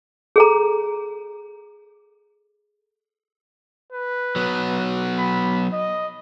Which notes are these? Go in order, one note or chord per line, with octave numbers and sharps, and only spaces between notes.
G#4 A4 A#5
B4
F#3 B3
B5
D#5